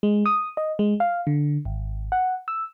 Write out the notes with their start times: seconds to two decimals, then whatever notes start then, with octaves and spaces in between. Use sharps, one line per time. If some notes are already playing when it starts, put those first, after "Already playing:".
0.03 G#3
0.26 D#6
0.57 D#5
0.79 G#3
1.00 F5
1.27 D3
1.65 G#1
2.12 F#5
2.48 E6